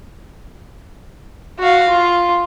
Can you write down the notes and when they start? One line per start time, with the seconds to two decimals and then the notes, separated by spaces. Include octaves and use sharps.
1.59 F#4 F5
1.89 F4